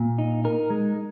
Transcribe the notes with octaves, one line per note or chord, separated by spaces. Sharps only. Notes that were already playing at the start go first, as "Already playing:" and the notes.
Already playing: A#2
D#4
D#4 A#4
G#3